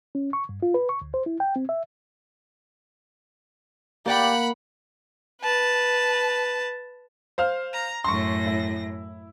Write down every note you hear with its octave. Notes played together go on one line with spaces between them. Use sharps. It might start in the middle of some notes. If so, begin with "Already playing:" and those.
C#4
C#6
G2
F4
B4
C#6
D2
C5
E4
G5
C4
E5
A#3 G4 D5 F#5 G5 B5
B4 A5
C5 F5 F6
A#5
F#2 A2 C6 C#6 A#6
E4